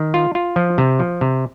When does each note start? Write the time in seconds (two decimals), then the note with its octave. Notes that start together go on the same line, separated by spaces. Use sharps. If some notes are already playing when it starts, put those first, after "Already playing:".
Already playing: D#3
0.14 F4
0.35 F4
0.56 F3
0.78 C3
0.99 F3
1.21 C3